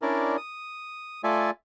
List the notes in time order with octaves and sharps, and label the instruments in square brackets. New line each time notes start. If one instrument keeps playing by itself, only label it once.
[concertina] C#4 D4 E4 A#4 D5
D#6
A3 F4 A4 D5 E5 G#5